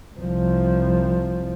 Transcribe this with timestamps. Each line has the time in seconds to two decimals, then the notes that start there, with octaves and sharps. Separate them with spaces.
0.19 C2 F3